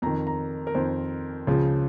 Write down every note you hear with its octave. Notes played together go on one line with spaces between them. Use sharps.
F2 D#3 A#5
A#5
A#4
F2 D#3 C5
C#2 C#3 F3